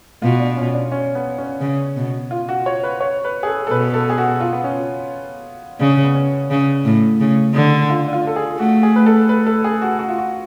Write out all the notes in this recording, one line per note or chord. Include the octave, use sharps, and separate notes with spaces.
B2 F4
D4
C#4
D4
C#4
B3
C#4
C#3
B2
F4
F#4
C#5
B4
C#5
B4
G#4
A4
A4
B2 B4
A4
G#4
F#4
F4
B3
C#4
C#3 D4
C#4
B3
C#4
C#3
A2
C#3
D3
F4
D4
F4
A4
G#4
A3 F#4
G#4
B4
A4
B4
A4
G#4
F#4
F#4
F4
F#4